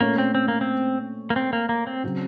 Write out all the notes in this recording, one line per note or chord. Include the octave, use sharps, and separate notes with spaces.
A#2 A3 A#3 C#4 A4 C#5
C4
C4
A#3
C4
A#3
C4
A#3
A#3
C4
C#3 F#3 C4 F#4